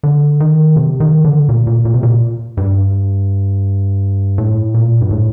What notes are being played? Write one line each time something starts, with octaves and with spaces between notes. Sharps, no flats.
D3
D#3
C3
D#3
D3
A#2
A#2
A#2
C3
A#2
G2
A2
A#2
G2
A2